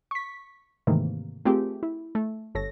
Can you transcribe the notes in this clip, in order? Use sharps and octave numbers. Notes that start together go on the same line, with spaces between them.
C#6 B6
G#2 C3 D#3 E3 A3 A#3
A3 C4 F4 G4 G#4 A#4
E4
A3
G1 A4 C#5 A#6